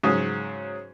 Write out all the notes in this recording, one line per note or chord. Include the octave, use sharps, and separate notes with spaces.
G#2 C#3 F#3